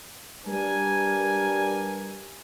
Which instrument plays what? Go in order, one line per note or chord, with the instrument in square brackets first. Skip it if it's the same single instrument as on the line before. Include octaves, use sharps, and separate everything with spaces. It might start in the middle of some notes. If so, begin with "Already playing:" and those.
[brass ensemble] G3 D4 A#4 B4 G#5